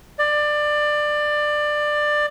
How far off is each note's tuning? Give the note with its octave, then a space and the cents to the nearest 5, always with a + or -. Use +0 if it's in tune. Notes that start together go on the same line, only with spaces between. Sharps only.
D5 +20